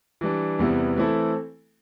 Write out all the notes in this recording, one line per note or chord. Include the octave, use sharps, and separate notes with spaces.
E3 G3 D4
E2 C3 G3 B3 E4
E3 A3 C4 E4 A4